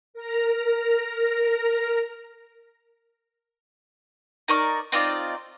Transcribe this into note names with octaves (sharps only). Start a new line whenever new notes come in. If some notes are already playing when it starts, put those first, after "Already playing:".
A#4 A#5
D#4 A#4 D5 C#6
C4 D#4 F4 D5